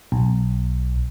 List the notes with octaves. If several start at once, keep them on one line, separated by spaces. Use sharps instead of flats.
B1